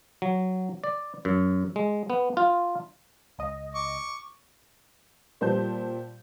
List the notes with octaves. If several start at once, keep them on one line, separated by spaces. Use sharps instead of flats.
F#3
D5
F#2
G#3
B3
F4
C#2 D#5
C#6 D6
A#2 G3 C5 A5 G6